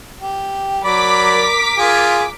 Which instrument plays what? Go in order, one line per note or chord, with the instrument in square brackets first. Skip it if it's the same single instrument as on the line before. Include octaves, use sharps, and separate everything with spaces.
[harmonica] G4
[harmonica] F#3 D5 B5 [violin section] A#4 D6 B6
[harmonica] F4 G#4